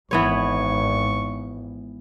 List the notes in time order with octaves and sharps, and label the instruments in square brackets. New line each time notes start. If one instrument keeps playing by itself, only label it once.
[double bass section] G#1 [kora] E3 B3 C#5 [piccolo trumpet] C#6